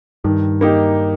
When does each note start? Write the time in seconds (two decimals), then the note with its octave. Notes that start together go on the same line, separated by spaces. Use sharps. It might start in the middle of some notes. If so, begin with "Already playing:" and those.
0.24 G2 D#3
0.61 A#3 D#4 G4